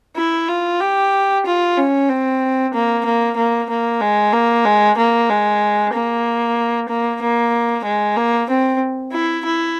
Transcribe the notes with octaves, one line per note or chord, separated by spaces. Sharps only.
E4
F4
G4
F4
C#4
C4
A#3
A#3
A#3
A#3
G#3
A#3
G#3
A#3
G#3
A#3
A#3
A#3
G#3
A#3
C4
E4
E4